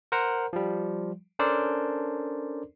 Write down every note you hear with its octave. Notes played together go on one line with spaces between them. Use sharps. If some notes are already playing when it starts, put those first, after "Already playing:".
A#4 C5 F#5 A#5
F3 G3
C#4 D4 A4 A#4 C5 D5